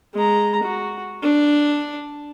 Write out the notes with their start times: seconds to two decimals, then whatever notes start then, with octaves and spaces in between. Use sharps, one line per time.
0.14 G#3 A#5
0.63 F#4
1.22 D4